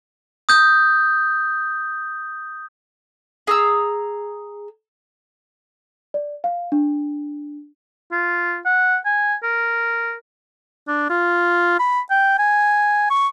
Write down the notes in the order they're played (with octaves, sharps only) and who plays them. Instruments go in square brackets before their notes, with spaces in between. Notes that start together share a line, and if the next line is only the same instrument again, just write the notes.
[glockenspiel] D#6 G6
[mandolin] G#4 A#5 E6
[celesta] D5
F5
D4
[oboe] F4
F#5
G#5
A#4
D4
F4
B5
G5
G#5
C#6